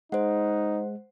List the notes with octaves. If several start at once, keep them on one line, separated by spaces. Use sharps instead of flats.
G#3 D#4 C5 F#5